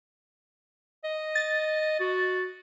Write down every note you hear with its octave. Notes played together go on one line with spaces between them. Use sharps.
D#5
A6
F#4